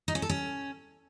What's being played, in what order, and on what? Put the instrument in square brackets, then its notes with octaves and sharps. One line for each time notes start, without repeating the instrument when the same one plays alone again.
[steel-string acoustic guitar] D#4
C#4
A4
C#4